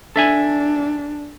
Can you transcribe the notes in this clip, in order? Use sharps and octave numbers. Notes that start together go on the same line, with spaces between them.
D4 A4 E5 G#5